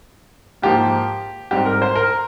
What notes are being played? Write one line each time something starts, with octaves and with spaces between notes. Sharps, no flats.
G#2 F3 A#3 G4
G#2 G3 C4 G4
A#4
C5
A#4